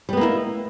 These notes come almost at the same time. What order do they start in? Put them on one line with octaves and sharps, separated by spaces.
G3 B3 A#3 E4 D#4